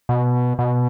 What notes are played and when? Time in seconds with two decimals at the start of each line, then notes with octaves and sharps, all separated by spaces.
0.09 B2
0.59 B2